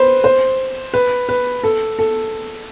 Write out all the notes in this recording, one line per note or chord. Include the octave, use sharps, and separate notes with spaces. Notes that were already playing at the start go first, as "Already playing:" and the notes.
Already playing: B4 C5
C5
B4
B4
A4
A4